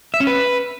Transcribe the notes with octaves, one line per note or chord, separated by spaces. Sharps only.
E5
C#4
B4